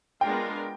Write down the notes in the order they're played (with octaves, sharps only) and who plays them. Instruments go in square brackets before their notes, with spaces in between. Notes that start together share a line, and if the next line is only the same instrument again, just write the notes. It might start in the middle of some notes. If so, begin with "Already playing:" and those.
[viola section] G#3 B3 D4 F4 A#4 [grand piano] G5